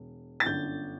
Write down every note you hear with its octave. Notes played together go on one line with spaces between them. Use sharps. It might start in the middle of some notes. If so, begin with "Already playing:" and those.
Already playing: E1
A6
G1 F#2 D3 G6